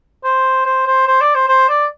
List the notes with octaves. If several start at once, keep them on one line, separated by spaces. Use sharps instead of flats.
C5
C5
C5
C5
D5
C5
C5
D5